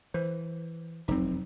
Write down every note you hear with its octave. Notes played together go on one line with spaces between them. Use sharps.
E3 C5
F1 E2 F#3 C4 D#4